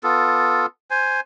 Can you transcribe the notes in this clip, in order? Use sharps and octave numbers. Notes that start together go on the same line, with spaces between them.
B3 F4 A4
C5 G#5